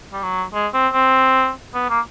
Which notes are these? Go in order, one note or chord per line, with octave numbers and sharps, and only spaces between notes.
G3
F#3
G#3
C4
C4
B3
A#3